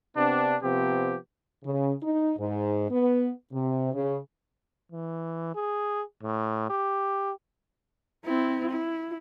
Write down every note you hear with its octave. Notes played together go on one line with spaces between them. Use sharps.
C3 B3 C4 D4
C3 F3 B3 C4 G4
C#3
D#4
G#2
B3
C3
C#3
E3
G#4
A2
G4
C4 E4
E4